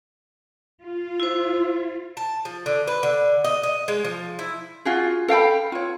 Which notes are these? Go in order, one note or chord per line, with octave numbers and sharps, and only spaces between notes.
F4
E4 C5
A5
F3
D3
B4
D3
D#5
D#5
G#3
F3
E4
F4 F#4 G#4
A4 F5 G5 B5
F4 C#5